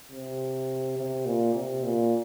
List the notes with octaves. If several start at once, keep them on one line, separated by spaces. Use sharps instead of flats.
C3
C3
A#2
C3
A#2